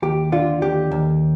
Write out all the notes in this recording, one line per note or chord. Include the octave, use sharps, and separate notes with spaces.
D#2 G4
D3 F4
D#2 G4
D#2